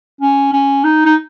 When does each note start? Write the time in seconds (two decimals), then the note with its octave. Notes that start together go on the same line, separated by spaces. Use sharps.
0.21 C#4
0.53 C#4
0.84 D#4
1.05 D#4